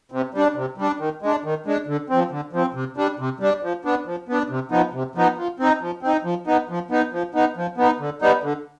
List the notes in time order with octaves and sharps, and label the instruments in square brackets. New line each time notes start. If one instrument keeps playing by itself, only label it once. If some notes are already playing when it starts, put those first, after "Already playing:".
[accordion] C3
G3 D4
C3
G3 D4
D#3
G#3 D4
D#3
G#3 D4
D3
F3 C4
D3
F3 C4
C3
G3 D4
C3
G3 D4
F3
B3 D4
F3
B3 D4
C3
F3 B3 D#4
C3
F3 B3 D#4
F3
C4 D#4
F3
C4 D#4
F3
B3 D#4
F3
B3 D#4
F3
B3 D#4
F3
B3 D#4
D3
G3 B3 D#4
D3